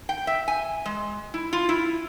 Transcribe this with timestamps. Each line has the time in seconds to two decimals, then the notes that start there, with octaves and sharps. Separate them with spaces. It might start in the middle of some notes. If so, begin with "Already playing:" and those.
0.09 G5
0.27 E5
0.48 G#5
0.85 G#3
1.34 E4
1.53 F4
1.69 E4